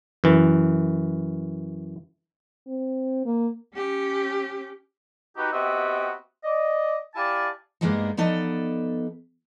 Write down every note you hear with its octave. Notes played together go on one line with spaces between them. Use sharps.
F#2 E3
C4
A#3
C#4 G4
D#4 F#4 G4 B4
B3 C4 F#4 G4 D#5 E5
D5 D#5
E4 G4 D5 F5 G#5 A5
G2 G#3 A#3 B3 D4 D#4
F3 B3 D#4 A4 D5